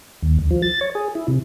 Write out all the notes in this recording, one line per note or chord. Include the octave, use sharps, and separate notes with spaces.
D#2
D2
F3
A6
C#5
G#4
E4
C3